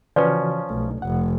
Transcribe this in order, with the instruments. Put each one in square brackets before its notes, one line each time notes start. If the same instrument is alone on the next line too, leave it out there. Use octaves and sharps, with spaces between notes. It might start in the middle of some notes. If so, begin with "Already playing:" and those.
[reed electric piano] C#3 E3 F#4 [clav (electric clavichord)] F3 C#4 [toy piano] B4 D5
[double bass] B1 [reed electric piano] A3
[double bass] F1 [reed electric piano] F#5